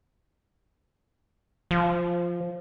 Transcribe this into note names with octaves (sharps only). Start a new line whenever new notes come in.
F3